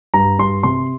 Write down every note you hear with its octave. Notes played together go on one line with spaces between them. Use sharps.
G2 A#5
G2 C6
C3 C6